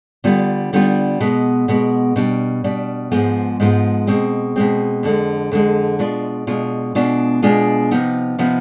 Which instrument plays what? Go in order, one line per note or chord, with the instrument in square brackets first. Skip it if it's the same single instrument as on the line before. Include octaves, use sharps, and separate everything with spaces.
[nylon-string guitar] D3 G3 B3 D4 F4
D3 G3 B3 D4 F4
B2 G#3 B3
B2 G#3 B3
B2 G3 D4
B2 G3 D4
G#2 F3 G#3 B3 F4
G#2 F3 G#3 B3 F4
B2 G#3 C4
B2 G#3 C4
F2 D3 G#3
F2 D3 G#3
B2 G#3 D4 F4
B2 G#3 D4 F4
B2 G#3 B3 D4 F4
B2 G#3 B3 D4 F4
C3 F3 B3 D#4
C3 F3 B3 D#4